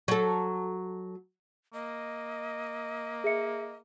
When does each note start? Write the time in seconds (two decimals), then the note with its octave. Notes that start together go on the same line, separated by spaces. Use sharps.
0.08 F#3 A4
1.74 A#3 D#5
3.24 G#4 E5 C#7